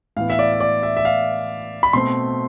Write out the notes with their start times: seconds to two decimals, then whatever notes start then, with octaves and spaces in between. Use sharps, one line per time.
0.17 A2 E3 B3 F5
0.30 E5
0.39 D5
0.52 E5
0.60 D5
0.83 E5
0.97 E5
1.05 F5
1.83 B5
1.93 B2 A3 C4 C6